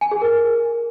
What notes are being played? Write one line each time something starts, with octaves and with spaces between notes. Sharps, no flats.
G#5
G#4
A#4